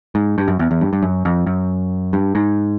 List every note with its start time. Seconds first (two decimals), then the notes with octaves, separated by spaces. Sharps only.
0.15 G#2
0.38 G2
0.48 F#2
0.59 E2
0.71 E2
0.81 G2
0.93 G2
1.02 F#2
1.25 F2
1.47 F#2
2.13 G2
2.35 G#2